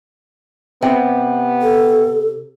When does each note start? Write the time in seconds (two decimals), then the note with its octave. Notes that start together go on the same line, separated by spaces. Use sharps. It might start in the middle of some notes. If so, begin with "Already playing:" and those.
0.82 C3 B3 E5 G5
1.62 A4